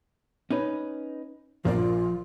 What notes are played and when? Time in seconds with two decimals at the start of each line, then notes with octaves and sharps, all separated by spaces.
0.51 C#4 D#4 B4
1.65 A#1 F3 F4 A#4 D5